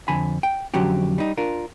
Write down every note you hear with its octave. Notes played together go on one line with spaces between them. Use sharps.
F2 D3 G#5 B5
G5
F2 D3 F#3 C#4 F#4 G4
G3 D#4
D4 F4 A#4